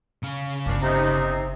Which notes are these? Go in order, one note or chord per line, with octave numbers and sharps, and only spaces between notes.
C#3 F5
G1 F3 A#3 C#4 D4
C3 D#4